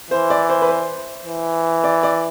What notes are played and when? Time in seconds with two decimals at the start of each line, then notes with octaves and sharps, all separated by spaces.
0.11 E3 C5
0.30 D5
0.49 C5
0.62 B4
0.69 C5
1.26 E3
1.84 D5
2.03 D5